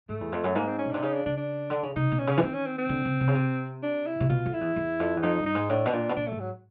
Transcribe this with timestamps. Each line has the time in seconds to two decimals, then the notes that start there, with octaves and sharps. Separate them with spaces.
0.09 G#2 A3
0.21 E2
0.32 F2
0.44 F#2
0.55 G#2 A#3
0.67 C4
0.79 C#4
0.85 B2
0.91 C3 D4
1.02 C#3 D#4
1.14 D4
1.26 C#3 D4
1.37 D4
1.70 D3
1.83 C#3
1.96 C3 D#4
2.12 B2
2.19 C#4
2.27 C#3
2.37 E3
2.42 D#3 C4
2.54 C#4
2.66 C4
2.78 C4
2.89 D3
3.05 C#3
3.21 C3
3.28 C#3
3.35 C3
3.83 D4
4.06 E4
4.20 C3
4.29 B2 F4
4.46 F2
4.53 E4
4.61 E2
4.76 E2
5.00 F2
5.17 E2
5.23 F2 D#4
5.39 G2
5.46 D#4
5.55 G#2
5.69 A2 D4
5.86 B2
5.93 A#2 D4
6.09 B2
6.16 A#2 D4
6.28 G#2 A3
6.40 F#3